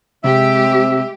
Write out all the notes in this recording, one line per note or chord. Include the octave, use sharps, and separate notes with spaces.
C3 G#3 G4 E5